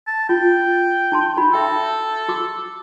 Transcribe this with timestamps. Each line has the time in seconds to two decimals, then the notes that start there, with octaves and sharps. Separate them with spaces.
0.07 A5
0.29 F4 G5
1.12 D#4 A5 C6
1.37 D#4 F#4 B5
1.53 A4 E5 G5
2.29 F#4 D6